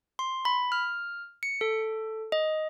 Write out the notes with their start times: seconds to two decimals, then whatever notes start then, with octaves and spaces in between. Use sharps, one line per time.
0.19 C6
0.45 B5
0.72 F6
1.43 C#7
1.61 A4
2.32 D#5